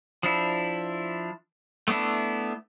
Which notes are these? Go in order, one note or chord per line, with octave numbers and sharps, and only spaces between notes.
F3 D4 E4
A3 B3 D4 E4